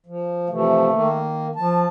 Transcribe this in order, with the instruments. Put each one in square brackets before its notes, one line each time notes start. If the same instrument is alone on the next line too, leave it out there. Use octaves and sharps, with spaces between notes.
[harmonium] F3
[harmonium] C3 E3 F3 [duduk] A3
[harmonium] D#3 A#3
[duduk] F3 [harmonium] A5